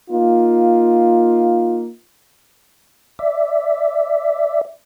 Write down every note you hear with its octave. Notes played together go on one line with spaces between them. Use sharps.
A#3 D#4 F4
D5 E5